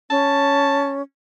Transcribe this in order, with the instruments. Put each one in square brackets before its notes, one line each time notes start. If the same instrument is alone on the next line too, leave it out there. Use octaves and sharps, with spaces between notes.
[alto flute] C#4 [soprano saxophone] A5